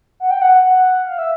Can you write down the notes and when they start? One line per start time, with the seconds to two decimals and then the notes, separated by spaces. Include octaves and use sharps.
0.20 F#5
0.31 G5
0.42 F#5
0.63 F#5
1.06 F5
1.18 E5